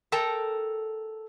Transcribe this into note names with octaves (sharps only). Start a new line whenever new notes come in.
A4 A#4 G5 A5